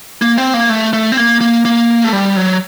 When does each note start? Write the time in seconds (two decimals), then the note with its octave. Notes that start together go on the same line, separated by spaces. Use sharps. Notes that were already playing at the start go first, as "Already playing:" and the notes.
0.22 A#3
0.37 C4
0.54 A#3
0.70 A3
0.93 A3
1.12 C4
1.17 A#3
1.41 A#3
1.65 A#3
2.04 A3
2.13 G3
2.36 F#3